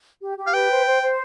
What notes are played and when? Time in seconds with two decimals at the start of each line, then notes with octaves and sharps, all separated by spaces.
0.22 G4
0.38 G4
0.47 F5
0.54 B4 G5
0.70 C5
0.85 C5
1.02 C5